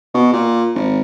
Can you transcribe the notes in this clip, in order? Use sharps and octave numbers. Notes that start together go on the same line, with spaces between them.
B2
A#2
G#1